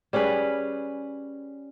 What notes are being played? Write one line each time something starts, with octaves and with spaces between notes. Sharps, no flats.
G3 C#4 G#4 B4